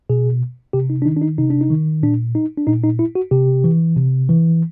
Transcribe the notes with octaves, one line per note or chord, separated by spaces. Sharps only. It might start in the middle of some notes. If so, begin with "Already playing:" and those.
B2 G#4
C3 G4
D#4
D4
D#3 D#4
D4
D#4
C3 D#4
D4
D#4
D#3
A#2 D4
D#4
D4
A#2 D#4
D#4
E4
F#4
C3 G4
E3
C3
E3